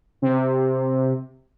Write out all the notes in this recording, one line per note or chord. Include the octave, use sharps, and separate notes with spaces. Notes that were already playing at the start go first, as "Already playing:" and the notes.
C3